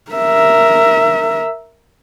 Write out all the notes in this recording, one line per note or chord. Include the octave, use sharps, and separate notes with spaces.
A#4 E5